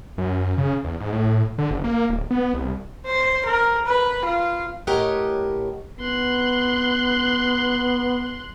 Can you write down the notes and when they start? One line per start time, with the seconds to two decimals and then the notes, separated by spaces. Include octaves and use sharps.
0.18 F#2
0.58 C#3
0.84 E2
1.00 G#2
1.13 A2
1.58 D3
1.70 F#1
1.84 A#3
2.10 D1
2.31 B3
2.54 C2
3.06 C5
3.46 A#4
3.86 B4
4.25 F4
4.87 A2 G4 A#4 C#5 D#5 F#5
6.00 B3 C6 F#6